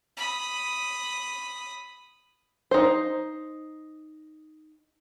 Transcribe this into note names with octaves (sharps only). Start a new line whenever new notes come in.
B5 D#6
D#4 C5